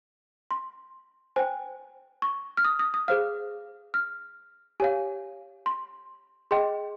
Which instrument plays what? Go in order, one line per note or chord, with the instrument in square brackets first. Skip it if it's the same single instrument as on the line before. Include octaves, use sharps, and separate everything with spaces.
[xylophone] C6
C5 G5 G#5
C#6
F6
D#6
D#6
D#6
G#4 C5 F5 F6
F6
G4 C#5 F5 G#5
C6
G#4 D#5 G5 C6